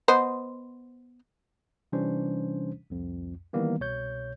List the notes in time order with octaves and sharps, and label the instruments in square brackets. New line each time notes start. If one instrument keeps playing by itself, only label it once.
[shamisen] B3 C5 D#5
[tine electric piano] C3 E3 G3 C#4 D4 C5
C2 F2
D#3 E3 G3 A#3 B3
C2 B2 C#5 G6